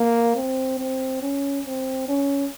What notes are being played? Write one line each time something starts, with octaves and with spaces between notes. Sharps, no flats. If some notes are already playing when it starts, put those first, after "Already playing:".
Already playing: A#3
C4
C4
C#4
C4
C#4